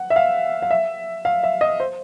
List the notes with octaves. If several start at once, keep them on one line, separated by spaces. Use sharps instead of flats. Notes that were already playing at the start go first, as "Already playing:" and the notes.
Already playing: F#5
E5
F5
F5
E5
F5
E5
D#5
C5